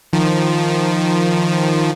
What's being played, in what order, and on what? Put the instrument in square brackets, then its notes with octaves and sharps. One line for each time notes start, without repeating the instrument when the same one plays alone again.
[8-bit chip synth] D#3 F3